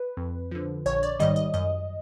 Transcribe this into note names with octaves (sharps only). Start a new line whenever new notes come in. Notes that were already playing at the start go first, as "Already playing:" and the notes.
Already playing: B4
F2
D3 F3
A#1 C#5
D5
G#2 D#3 G3 D#5
D#5
F#2 D#5